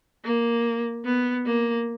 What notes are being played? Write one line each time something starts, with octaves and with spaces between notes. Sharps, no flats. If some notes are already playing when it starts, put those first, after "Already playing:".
A#3
B3
A#3